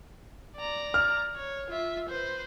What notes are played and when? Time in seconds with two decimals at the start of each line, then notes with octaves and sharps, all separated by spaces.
0.56 D5 A#5
0.94 F6
1.36 C#5
1.70 F4 E5
2.09 B4 C5